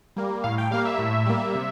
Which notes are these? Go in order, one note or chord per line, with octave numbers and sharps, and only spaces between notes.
G3 A#3
A2 F5
G5
G3 A#3 F5
E5
A2
G3 A#3
C3